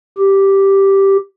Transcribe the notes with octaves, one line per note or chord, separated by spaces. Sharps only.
G4